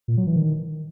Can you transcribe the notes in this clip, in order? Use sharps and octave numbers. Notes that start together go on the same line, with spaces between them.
A#2
F#3
E3
D#3